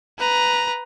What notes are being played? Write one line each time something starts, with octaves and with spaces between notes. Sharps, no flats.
B4 A#5